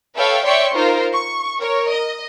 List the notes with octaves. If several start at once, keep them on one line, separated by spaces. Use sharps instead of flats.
A4 B4 C#5 E5 F5 G5
C#5 D5 E5 G5 C6 C#6
D#4 F4 A#4 C5
C#6
A#4 C#5
D#5